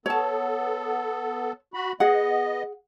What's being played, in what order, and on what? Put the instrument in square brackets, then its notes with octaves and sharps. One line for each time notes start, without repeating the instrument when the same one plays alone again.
[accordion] B3 A4 [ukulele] C#5 A5
[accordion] F#4 B5
[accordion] B3 D#5 [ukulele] G#4 F#5